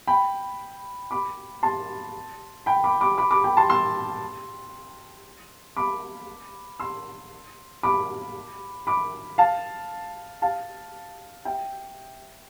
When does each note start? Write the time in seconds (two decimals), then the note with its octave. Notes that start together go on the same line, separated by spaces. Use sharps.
0.07 G5 B5
1.11 B5 D6
1.63 A5 C6
2.66 G5 B5
2.84 B5 D6
3.01 B5 D6
3.18 B5 D6
3.31 B5 D6
3.44 G5 B5
3.57 A5 C6
3.70 C6 E6
5.77 B5 D6
6.80 C6 E6
7.83 B5 D6
8.87 B5 D6
9.38 F5 A5
10.42 F5 A5
11.45 E5 G5